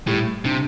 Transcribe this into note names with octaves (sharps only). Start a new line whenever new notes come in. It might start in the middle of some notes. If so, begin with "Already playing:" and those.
A2 G3
C3 D4